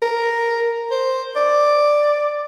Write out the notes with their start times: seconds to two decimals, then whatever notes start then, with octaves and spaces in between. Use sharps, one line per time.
0.02 A#4
0.91 C5
1.36 D5